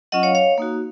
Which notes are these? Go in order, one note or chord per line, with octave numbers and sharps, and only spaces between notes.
F#3 C#4 F4 D#5 F#5
C#5 F5
C#5 F5
A#3 D#4 F#4